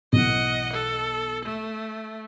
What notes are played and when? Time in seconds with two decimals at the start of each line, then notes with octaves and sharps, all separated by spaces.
0.13 B1 E3 D#5 F#5
0.73 A4
1.45 A3